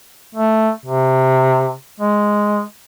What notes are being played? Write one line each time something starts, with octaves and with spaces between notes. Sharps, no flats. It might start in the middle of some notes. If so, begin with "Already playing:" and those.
A3
C3
G#3